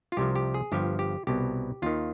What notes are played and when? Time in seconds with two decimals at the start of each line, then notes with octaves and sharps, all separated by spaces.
0.12 F4
0.17 C2 C3 F3 G4
0.35 G4
0.54 G#4
0.72 G1 G2 F3 G4
0.99 G4
1.27 C2 B2 G4
1.82 D#2 D#3 F4